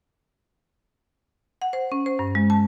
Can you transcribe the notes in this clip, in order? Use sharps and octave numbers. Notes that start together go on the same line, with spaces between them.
F#5
C5
C#4
C5
G2
G#3
A5